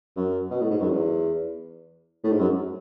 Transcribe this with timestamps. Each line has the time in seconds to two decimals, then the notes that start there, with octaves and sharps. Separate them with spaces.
0.16 F#2
0.51 B2
0.61 A2
0.70 G#2
0.81 F#2
0.90 E2
2.24 A2
2.32 G#2
2.39 F#2